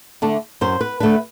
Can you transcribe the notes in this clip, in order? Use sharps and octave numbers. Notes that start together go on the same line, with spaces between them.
D3 A3 D4
F#2 C5
B4
D3 A3 D4 B4